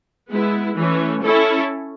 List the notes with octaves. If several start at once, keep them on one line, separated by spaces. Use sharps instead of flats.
G#3 B3 E4
E3 A3 C#4
C#4 E4 A4